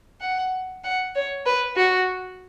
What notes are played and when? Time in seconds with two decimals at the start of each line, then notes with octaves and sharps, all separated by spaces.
0.21 F#5
0.84 F#5
1.15 C#5
1.46 B4
1.76 F#4